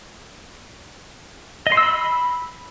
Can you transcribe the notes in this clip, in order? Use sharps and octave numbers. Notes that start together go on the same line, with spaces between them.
D#5
C6
E6
B5